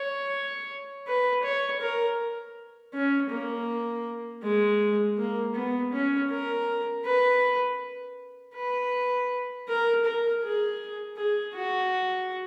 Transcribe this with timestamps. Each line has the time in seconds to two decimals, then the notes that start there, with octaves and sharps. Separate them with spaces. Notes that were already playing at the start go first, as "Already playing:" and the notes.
Already playing: C#5
1.07 B4
1.43 C#5
1.81 A#4
2.94 C#4
3.30 A#3
4.43 G#3
5.18 A#3
5.55 B3
5.92 C#4
6.31 A#4
7.05 B4
8.55 B4
9.68 A#4
10.05 A#4
10.43 G#4
11.17 G#4
11.55 F#4